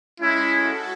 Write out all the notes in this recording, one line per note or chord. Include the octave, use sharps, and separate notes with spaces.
G#3 C#4 E4
F#4 A4